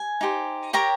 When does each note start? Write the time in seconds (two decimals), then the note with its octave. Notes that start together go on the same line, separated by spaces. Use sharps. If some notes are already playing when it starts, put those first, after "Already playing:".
Already playing: G#5
0.21 D#4 G4 C5
0.73 G4 A#4 C#5 G5 A#5